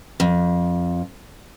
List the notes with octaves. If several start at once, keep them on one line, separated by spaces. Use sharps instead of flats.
F2